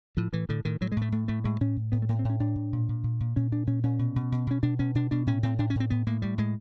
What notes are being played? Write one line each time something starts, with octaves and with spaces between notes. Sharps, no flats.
A2 F3
A2 E3
A2 D3
A2 D#3
A2 F#3
G#3
A2
A3
A2 A3
A2 A3
A2 G#3
A2 C#4
A2
A2 B3
A3
A2 A#3
C4
A2
C#4
A2 D4
A2
A#2
A#2
A#2
A#2
A#2 C#4
A#2 D4
A#2 C#4
A#2 C#4
B2
B2
B2
B2 C#4
B2 D4
B2 C#4
B2 D4
B2 D4
A2 C#4
A2 C4
A2 D4
C#4
A2 C4
A2 B3
A2 A#3
A2 G3
A2 G#3